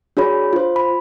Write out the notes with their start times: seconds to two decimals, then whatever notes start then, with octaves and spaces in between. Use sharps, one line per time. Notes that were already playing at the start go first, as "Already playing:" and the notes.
0.17 D4 F#4 G#4 C#5 B5
0.53 F4 C5
0.76 B5